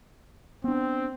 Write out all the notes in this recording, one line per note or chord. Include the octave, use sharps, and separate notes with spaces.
B3 C4 D4